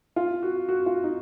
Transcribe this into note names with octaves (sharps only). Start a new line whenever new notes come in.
F4
F#4
F#4
F4
D#4